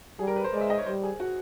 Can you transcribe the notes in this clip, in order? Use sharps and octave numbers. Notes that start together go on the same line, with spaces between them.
G3 G#4
A#4
B4
C5
G#3 D5
E5
D#5
C#5
G3 C5
G#4
F#4